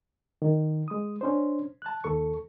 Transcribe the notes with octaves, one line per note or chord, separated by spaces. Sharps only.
D#3
G#3 D#6
C#4 D4 C5
A5 F#6
D#2 A4 C#6